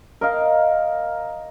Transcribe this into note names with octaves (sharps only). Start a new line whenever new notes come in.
A#4 D#5 F5